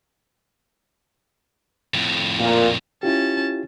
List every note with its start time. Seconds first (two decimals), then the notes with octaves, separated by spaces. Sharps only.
1.94 F2 A2
2.39 A#2
3.03 C#4 E4 F4 G4 A5